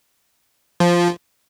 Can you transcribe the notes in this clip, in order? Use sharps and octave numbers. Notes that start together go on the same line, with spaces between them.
F3